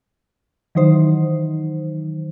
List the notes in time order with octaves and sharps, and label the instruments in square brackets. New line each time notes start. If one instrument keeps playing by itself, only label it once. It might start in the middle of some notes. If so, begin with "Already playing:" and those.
[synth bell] D#3 E3 F#3 D#4 C5